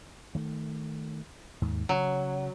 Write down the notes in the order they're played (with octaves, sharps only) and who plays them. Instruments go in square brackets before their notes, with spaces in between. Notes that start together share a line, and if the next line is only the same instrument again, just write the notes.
[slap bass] D#3 A3
D#2 G#2
[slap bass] C#3 [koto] F#3